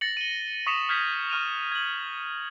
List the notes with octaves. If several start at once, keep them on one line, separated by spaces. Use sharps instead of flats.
A6 A#6 C#7 F#7
D#7 G7
C#6 D#6 B6 C#7 E7 F7
D#6 F6 G6 G#6 B6
C#6 F6 D#7 F7
G#6 F#7